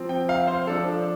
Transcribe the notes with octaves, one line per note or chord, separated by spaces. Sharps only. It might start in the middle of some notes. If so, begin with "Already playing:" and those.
Already playing: F3 C4
G5
F5
C5
F3 D4 A4